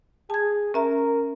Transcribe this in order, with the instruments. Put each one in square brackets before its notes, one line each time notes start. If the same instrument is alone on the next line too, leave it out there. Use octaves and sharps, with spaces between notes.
[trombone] G#4 [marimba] A5 G#6
[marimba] C#4 E5 A#5 [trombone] A#4